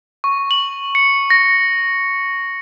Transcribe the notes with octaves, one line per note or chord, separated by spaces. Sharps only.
C#6
F#7
C#7
A#6